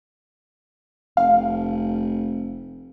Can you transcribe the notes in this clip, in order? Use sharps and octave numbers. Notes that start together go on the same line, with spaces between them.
F1 F5